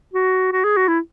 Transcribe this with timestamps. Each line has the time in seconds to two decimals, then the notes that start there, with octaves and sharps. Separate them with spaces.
0.13 F#4
0.52 F#4
0.64 G#4
0.77 F#4
0.88 E4